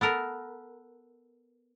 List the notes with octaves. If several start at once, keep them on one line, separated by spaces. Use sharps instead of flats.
B3 A4 A#4